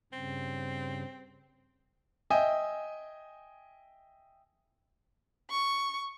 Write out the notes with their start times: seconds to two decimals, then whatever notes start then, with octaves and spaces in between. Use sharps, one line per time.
0.13 G2 C#3 C4
2.30 D#5 E5 G5 G#5
5.50 C#6